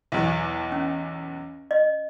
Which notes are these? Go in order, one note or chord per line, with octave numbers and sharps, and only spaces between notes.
B1 E2
C#4
D#5